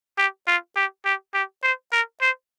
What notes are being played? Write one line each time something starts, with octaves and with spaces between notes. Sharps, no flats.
G4
F4
G4
G4
G4
C5
A#4
C5